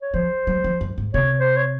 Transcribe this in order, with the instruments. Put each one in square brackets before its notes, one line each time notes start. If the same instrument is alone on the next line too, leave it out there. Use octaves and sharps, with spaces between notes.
[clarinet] C#5
[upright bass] F3 [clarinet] C5
[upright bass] F#3
F3
F#2
G#2
[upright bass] C3 [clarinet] C#5
[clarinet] C5
C#5